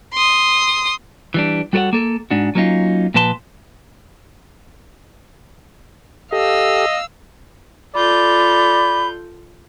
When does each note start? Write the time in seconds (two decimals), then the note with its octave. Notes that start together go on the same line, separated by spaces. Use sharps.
0.14 C6 D#6
1.34 E3 G3 D4
1.73 G3 F#4 A4 A#4 C#5 F#5
1.93 A#3 A4
2.30 G#2 D4 F#4
2.55 F#3 A#3 C#4 D#4 F4
3.14 A#2 F3 B4 A5 C6
6.32 G4 A4 D#5 F5 E6
7.94 F4 A4 D5 B5 G6